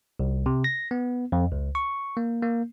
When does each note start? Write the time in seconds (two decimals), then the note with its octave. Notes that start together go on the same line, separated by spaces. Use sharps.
0.19 C2
0.46 C3
0.64 A#6
0.91 B3
1.32 F2
1.52 C#2
1.75 C#6
2.17 A#3
2.42 A#3